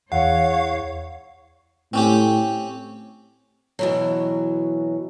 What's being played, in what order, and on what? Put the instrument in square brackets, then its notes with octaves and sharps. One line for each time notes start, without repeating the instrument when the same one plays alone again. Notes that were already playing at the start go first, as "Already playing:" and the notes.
[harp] E2 G#6 [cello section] C#5 [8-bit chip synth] F5 [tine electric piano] F#5
[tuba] A2 [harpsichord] C4 C#4 G4
[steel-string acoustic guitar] B2 E3 F#3